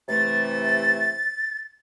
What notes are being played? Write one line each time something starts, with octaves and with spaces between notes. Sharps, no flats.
C3 E3 A3 A6